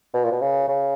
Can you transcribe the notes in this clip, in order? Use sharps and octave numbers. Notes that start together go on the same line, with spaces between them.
B2
A#2
B2
C#3
C#3